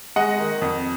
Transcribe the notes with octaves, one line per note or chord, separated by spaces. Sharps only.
G#3 D#5 F#5
D#3
F2